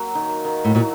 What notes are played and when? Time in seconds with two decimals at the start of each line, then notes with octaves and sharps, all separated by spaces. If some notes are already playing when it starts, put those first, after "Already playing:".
Already playing: F#3 A#3
0.15 D#3
0.45 D#3
0.65 A2
0.74 A#2 F#3